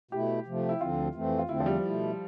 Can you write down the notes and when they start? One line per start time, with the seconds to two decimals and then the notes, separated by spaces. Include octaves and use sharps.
0.11 B2 A3 E4 G4
0.46 C3 F3 A3
0.69 E4
0.81 D2 D3 F3 C4 F4
1.15 F2 E3 A3 C4
1.39 F4
1.49 E2 D3 A3 C4 E4
1.60 F3
1.66 G3
1.84 B2 A3 E4